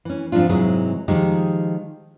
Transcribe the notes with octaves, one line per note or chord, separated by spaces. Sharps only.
E3 C#4
G#2 F3 C4 D4 F4
G#2 C3 E3 F#3 G#3 G#4
D#3 F3 G#3 D#4 F4 G4